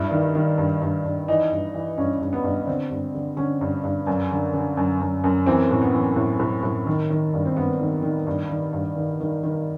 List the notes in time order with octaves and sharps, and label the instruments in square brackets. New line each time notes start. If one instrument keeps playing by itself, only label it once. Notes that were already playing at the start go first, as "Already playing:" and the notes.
Already playing: [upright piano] G2 E4
D#3
D#3
G2
G2
G2
E3 D#4
G2
E3
G2 C#4
G2
B3
G2
D3 C4
G2
D3
D3 C#4
G2
G2
F#2
D3
D3
F#2
F#2
F#2
E3 C4
A2
B3
E3
A2
A2
A2
D#3
D#3
G2
C4
G2 B3
D#3
D#3
G2
D#3
G2
D#3
D#3
D#3